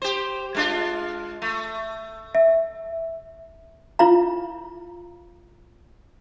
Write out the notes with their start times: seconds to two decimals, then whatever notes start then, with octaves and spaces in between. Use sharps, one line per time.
0.02 G4 C5
0.55 G#3 D4 F4
1.42 A3
2.35 E5
3.99 E4 F4 F5 A#5